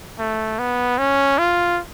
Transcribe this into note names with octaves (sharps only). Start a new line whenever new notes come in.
A3
B3
C#4
F4